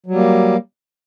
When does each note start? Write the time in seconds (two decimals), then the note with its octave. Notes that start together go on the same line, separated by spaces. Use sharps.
0.06 F#3
0.11 G3
0.16 A#3